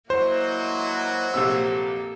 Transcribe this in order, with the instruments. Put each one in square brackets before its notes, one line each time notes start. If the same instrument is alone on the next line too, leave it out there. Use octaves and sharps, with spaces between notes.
[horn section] F#3 F#4 [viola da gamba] A#3 E4 D#5 [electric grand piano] C5
[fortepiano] A#1 C3 E6 [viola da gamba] A#3 G4 A4